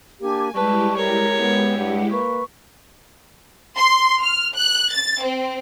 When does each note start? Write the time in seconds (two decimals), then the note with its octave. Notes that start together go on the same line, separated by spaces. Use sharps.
0.21 A#3 D4 G4 G#5
0.54 G3 G#3 E4 G4 B4 A5 C#6
0.97 A#4 C#5
1.39 B3
1.77 G2 F#5
2.10 A#3 B4 C#6
3.77 C6
4.20 F6
4.55 F#6
4.92 A6
5.22 C4